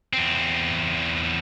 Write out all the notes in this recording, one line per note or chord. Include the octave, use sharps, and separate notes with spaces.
E2 C4